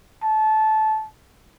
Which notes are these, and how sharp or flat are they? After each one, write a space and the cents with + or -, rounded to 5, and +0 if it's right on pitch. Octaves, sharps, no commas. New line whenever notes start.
A5 -20